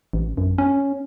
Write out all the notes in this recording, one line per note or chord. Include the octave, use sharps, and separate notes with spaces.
A1
F#2
C#4